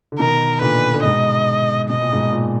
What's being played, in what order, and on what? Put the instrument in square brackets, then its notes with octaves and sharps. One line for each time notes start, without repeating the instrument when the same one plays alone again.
[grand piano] D3
[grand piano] B2 D#3 [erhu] A#4
[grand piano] A#2 D3 [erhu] B4
[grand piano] D3
[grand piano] G#2 B2 [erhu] D#5
[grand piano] B2 [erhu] D#5
[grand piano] A#2
G#2 B2
A#2